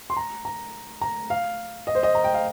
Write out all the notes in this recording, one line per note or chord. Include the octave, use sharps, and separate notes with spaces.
C6
A#5
A#5
A#5
F5
D#5
C5
D#5
A#5
G5
F5